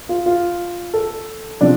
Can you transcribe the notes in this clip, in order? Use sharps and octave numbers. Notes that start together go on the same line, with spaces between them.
F4
F4
A4
C3 F3 D4